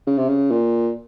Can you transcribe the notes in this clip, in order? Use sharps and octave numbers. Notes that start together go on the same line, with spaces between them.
C#3
C3
C#3
A#2